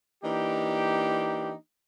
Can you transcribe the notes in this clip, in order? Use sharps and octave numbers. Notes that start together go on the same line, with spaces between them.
E3 A#3 D4 D#4 G4